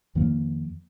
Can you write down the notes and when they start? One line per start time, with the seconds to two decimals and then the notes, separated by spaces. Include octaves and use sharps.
0.15 F2 D#3 F3 A#3